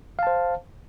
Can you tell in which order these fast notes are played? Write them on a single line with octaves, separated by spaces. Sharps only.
F5 A5 C5